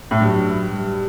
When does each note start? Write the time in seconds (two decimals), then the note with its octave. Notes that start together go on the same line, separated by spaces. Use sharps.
0.11 A2
0.20 G2 F#3
0.72 G3